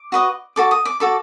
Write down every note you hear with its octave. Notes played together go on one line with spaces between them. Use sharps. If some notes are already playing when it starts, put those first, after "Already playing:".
Already playing: D6
F#4 B4 D#5
F#4 A4 D6
D#6
D6
F#4 A4 D6